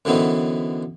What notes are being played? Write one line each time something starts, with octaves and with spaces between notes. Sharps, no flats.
F#2 D3 E3 B3 C4 D#4